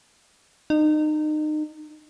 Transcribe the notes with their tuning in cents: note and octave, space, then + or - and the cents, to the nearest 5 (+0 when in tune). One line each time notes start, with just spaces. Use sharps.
D#4 -30